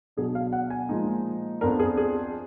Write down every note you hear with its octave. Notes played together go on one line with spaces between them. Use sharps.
B2 F#3 D4 G#4
F5
F#5
G#5
A#2 F3 G#3 D#4
F2 F3 B3 D4 A#4
G#4
G#4